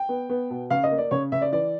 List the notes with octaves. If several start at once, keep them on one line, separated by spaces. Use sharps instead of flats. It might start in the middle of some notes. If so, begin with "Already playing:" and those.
Already playing: G5
B3
B3
B2
C#3 F5
D#5
A#3
D5
C#3 C#5
C#3 E5
D5
E3 D5